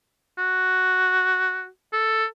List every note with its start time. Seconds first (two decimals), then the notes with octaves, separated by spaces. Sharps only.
0.39 F#4
1.93 A4